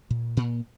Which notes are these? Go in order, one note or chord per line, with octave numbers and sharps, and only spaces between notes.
A#2
A#2